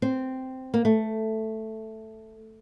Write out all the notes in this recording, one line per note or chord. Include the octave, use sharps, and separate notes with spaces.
C4
A#3
A3